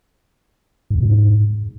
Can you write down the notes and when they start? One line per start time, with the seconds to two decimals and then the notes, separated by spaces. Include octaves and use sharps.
0.90 G#2
0.95 E2
1.00 B2
1.05 G#2